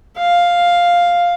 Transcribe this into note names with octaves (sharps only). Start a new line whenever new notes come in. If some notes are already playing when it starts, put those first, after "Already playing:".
F5